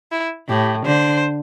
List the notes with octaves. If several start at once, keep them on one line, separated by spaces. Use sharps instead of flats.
E4
A2 G4
D3 C5